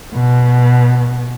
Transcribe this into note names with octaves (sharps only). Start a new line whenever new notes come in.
B2